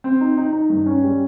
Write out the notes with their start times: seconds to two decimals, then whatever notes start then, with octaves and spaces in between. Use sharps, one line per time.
0.04 C4
0.21 D#4
0.37 D#4
0.53 D#4
0.70 G2
0.86 C#4
1.04 G3